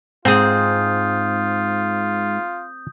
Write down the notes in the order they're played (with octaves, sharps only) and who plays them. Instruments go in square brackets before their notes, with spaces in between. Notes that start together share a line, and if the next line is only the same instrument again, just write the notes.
[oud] G#2 [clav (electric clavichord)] C4 G#4 [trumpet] F4 [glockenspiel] D#6 G6